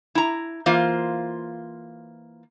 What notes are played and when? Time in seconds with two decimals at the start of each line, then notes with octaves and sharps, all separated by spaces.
0.15 E4 A#5
0.66 E3 A#3 F4 C5